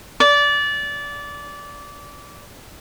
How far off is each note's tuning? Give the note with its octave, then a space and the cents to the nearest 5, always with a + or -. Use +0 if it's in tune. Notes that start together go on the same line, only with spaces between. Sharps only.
D5 -20